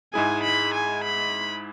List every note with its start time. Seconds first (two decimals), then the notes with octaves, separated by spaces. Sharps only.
0.13 G#2 G#3 E4 G#4 G#5
0.43 B5
0.74 G#5
1.04 B5